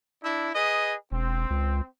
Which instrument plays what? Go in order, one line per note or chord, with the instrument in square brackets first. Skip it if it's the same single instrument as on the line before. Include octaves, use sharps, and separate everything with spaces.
[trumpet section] D4 E4
G#4 B4 D#5
[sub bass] E1 [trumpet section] C4
[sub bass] C#2